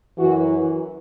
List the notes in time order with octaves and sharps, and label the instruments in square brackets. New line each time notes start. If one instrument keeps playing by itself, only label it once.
[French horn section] F#2 E3 F#4